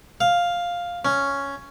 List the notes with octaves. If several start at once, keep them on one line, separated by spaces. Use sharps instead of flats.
F5
C#4